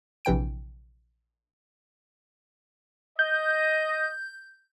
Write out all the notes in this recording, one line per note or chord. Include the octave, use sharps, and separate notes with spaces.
A#1 C3 E3 G5 D7
D#5 G6